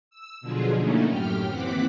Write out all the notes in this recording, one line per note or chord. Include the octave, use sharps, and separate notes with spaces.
E6
B2 D3 F3 F#3 F4 G#4
D3 A3 A#3 C#4 D#4 E4
F#2 A2 G4 G5 F6
D#2 E3 C4 F#5 D6 B6